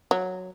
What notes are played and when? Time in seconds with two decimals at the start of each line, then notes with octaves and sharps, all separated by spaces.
0.11 F#3